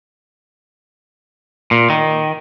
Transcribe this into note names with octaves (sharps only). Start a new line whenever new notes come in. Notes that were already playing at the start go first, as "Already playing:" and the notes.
A#2
D#3